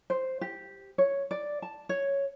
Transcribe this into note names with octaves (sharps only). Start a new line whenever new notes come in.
C5
G4
C#5
D5
A5
C#5